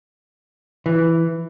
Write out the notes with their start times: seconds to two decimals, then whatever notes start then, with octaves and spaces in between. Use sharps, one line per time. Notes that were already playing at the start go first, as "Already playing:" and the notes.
0.86 E3